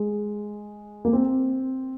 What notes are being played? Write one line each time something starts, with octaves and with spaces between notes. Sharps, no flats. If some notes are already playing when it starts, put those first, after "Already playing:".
Already playing: G#3
A#3
C4